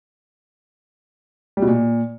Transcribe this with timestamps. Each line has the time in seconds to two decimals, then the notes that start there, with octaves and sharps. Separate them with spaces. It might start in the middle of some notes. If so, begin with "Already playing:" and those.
1.57 G3
1.62 B2
1.67 A#2